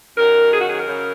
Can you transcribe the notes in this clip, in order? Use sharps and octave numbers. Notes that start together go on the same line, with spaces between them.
F#2 D#3 F#3 A#4
G#4
F#4
G#4
A#4
F#2 C#3 F#3